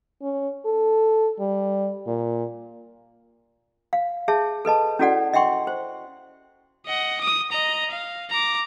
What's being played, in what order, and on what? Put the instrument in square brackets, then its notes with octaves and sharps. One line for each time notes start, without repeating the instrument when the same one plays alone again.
[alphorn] C#4
A4
G3
A#2
[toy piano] F5
G#4 C#5 E5 A5
A4 B4 D#5 A5
C#4 E4 F#4 A4 D5 F#5
D#5 E5 F#5 G5 C6 C#6
C5
[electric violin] D#5 F#5
D#6
D#5 A#5
F5
A#5 D6